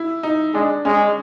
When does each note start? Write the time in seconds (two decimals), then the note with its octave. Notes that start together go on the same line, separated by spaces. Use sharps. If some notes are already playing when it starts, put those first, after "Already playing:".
Already playing: E4
0.23 D#4
0.54 G#3 D4
0.85 G#3 C#4